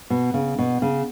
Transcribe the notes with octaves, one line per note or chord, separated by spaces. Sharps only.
B2
C#3
B2
C#3